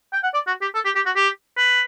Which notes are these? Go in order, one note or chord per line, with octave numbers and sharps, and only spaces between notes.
G5
F#5
D5
F#4
G4
A4
G4
G4
F#4
G4
B4